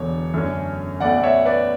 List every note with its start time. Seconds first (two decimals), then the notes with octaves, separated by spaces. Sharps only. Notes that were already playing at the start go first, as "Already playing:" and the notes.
Already playing: E1 E2 D3 C#5
0.34 F#2 D3 A3 C#4
1.00 B1 B2 A3 D5 F#5
1.23 C#5 E5
1.45 B4 D5